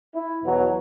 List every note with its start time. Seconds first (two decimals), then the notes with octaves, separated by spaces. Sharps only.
0.15 E4
0.44 E2 B2 F#3